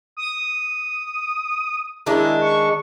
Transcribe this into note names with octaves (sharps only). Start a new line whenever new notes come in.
D#6
D#3 G#3 D4 E4
C#6